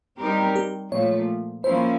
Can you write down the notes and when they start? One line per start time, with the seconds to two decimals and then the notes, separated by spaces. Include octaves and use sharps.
0.19 G3 C4 D#4 G4 A#4
0.56 G4
0.92 A#2 F3 A3 C#5
1.64 F3 A#3 C#4 E4 C5